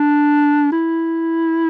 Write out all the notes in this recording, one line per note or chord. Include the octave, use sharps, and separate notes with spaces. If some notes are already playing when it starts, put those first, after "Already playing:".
Already playing: D4
E4